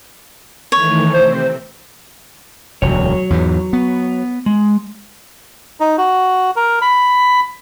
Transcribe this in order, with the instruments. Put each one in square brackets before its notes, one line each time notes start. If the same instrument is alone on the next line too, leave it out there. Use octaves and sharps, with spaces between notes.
[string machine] D#3 E3 A3 [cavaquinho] C#5
[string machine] C3 C4 [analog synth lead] C5
[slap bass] E1 D2 [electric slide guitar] F#3 C#5
[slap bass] E2 G#2 E3
B3
[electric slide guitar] G#3
[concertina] D#4
F#4
A#4
B5